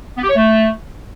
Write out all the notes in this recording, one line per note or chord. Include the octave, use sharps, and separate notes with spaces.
B3
G4
C#5
A3